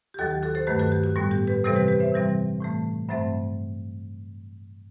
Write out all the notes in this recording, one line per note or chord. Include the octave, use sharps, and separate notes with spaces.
G4
D#2 D#3 F#3 F#4 A4
G4
F#4 A4
A4 C5
G2 D#3 F#3 A3 G4 B4
F#4 A4
G4
F#4
A2 G3 B3 F#4
G4
G4 B4
C3 E3 G3 C4 A4 C5
G4 B4
G4 B4
C5 E5
C3 E3 G3 C4
A2 E3 A3
G2 F#3 A3 C4 C5 E5